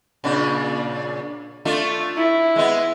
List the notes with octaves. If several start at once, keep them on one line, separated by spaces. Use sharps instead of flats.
A#2 C#3 D4
A3 D4 F4
E4
G#3 B3